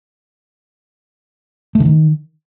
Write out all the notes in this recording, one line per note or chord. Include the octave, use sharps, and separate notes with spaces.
A3
D3
D#3